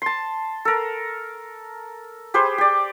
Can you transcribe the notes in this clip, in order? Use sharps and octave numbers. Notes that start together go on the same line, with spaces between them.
A5 C6
A4 A#4
G4 G#4 B4 C5
G4 D5